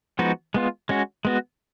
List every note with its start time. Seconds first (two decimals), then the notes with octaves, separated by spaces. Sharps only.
0.19 F3 G#3 B3 D#4 F#4
0.54 G#3 B3 F4
0.89 G#3 C#4 F#4
1.25 G#3 B3 F#4